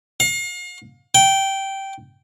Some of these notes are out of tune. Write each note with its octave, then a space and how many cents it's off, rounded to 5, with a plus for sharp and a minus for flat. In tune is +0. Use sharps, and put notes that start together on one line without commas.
F5 +40
G5 -10